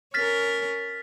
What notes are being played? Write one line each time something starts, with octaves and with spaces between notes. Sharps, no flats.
C#4 A#4 F6 A6 B6